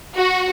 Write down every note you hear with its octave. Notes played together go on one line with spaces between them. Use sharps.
F#4